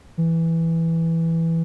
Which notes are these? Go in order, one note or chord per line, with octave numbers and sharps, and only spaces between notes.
E3